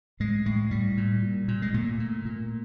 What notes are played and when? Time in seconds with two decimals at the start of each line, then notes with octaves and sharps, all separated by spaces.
0.20 A2 G#3
0.46 A2 G#3
0.71 A2 G3
0.97 A#2
1.23 A#2
1.48 A#2
1.62 G#3
1.74 A#2 A3
2.00 A#2
2.25 A#2